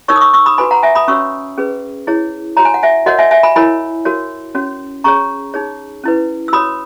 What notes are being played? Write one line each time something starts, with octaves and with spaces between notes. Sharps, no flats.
D#4 A#4 C#5 C#6 E6
D#6
C#6 E6
C#6 E6
B5 D#6
F#4 B4 G#5 B5
F#5 A#5
E5 G#5
B5 D#6
C#4 F#4 C#5 C#6 E6
C#4 G#4 B4
E4 G#4 C#5
F#4 C#5 A#5
G#5
F#5
E5 G#5
F#4 A#4 C#5 D#5 F#5
E5 G#5
E5 G#5
G#5 B5
E4 A#4 C#5 G#5 B5
F#4 A#4 C#5
C#4 F#4 C#5
C#4 G#4 C#5 A#5 C#6
D#4 G#4 C#5
C#4 E4 B4
E6
F#4 C#5 B5 D#6